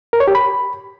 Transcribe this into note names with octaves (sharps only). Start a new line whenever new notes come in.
A#4
C#5
G4
B5